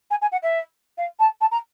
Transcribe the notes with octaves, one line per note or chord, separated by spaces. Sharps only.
G#5
G#5
F#5
E5
F5
A5
A5
A#5